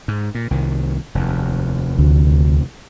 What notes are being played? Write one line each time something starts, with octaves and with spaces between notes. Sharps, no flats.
G#2
A#2
C2 D#3
F1 D#2
D2